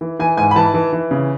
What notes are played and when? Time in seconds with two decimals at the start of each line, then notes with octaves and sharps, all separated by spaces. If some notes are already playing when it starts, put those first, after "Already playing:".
0.01 E3
0.19 E3 G#5
0.37 G#2 G#5
0.51 B5
0.56 E3 A5
0.74 E3
0.93 E3
1.11 C#3